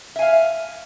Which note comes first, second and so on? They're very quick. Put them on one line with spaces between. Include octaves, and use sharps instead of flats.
E5 G#5 F5